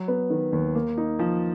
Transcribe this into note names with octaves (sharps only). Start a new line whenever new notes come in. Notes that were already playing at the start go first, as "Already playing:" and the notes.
Already playing: F#3
B3
D#3
D#2
A#3
D#4
F3